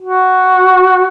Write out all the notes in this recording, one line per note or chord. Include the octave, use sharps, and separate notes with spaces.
F#4